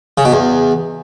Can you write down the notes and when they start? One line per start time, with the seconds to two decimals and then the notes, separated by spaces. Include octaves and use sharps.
0.18 C#3
0.25 B2
0.33 E2